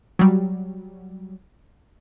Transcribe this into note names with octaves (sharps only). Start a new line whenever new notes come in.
F#3 G3